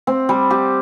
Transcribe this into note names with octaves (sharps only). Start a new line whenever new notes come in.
C4
G3
G4